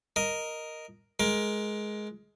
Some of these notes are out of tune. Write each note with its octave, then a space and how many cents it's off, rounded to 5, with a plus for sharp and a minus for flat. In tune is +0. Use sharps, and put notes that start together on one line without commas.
A#4 +0 D#5 +0
G#3 +15 A#4 +15